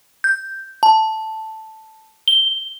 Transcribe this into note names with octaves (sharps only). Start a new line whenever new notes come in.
G6
A5
G7